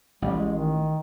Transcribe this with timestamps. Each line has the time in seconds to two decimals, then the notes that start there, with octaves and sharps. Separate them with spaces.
0.22 A1 G3
0.34 G#3
0.55 D#3